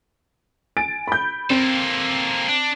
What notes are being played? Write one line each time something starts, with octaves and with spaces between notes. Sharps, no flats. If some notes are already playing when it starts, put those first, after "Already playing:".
G#5 A6 D7
B5 G6
A#3 C4 A4
D4